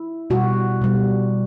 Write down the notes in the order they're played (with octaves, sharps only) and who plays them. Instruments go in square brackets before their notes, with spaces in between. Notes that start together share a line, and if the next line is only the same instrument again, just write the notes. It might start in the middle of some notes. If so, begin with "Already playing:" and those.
Already playing: [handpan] E4
B2 G3 F#4
B2 G3